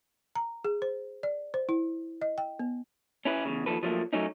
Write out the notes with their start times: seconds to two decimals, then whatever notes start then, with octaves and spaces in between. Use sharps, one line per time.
0.36 A#5
0.64 G#4
0.82 C5
1.23 D5
1.54 C5
1.69 E4
2.22 D#5
2.38 G5
2.59 B3
3.25 C#4 E4 B4
3.45 E2 A2 C#3
3.66 D#2 B2 F3 A4 B4
3.83 F3 F#3 A3 A#3
4.13 F#3 A3 C#4 D#4